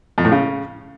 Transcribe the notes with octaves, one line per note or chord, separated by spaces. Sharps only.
F2
A2
C#3